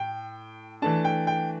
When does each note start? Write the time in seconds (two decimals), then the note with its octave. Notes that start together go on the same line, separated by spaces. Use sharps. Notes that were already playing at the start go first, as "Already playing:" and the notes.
Already playing: A2 G5
0.82 E3 A3 D4 A5
1.05 G5
1.27 G5